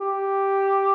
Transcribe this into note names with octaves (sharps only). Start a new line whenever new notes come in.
G4